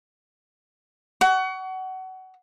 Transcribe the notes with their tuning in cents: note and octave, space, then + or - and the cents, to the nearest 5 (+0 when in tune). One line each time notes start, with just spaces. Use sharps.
F#5 +25 C#6 +30